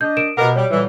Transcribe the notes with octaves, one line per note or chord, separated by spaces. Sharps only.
D4 D#5 G6
A#4 D7 E7
B2 B3 G4 A#4 D#5 F#5
G3 C#5
A#2 D3 E3 G3